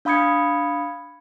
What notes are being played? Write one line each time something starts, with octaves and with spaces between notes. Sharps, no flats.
D4 F5 B5 D#6 G#6 C#7